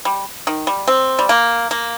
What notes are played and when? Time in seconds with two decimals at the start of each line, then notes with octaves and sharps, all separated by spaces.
0.05 G3
0.47 D#3
0.67 G3
0.88 C4
1.19 G3
1.29 A#3
1.71 A#3